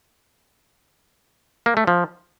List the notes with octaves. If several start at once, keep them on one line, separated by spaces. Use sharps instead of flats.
A#3
A3
F3